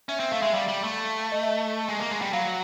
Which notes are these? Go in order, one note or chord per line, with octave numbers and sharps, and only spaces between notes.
C#4 E5
C4 E5
A3 F5
G#3 E5
G3 F5
G3
A3
D#5
E5
G#3
A#3
G#3
G3
F#3 F5